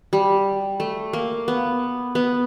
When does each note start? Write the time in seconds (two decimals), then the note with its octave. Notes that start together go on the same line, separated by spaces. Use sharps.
0.13 G3
0.80 A3
1.13 A#3
1.48 B3
2.15 B3